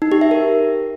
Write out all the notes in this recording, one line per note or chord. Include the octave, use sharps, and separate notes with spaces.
D#4
G4
E5
A#4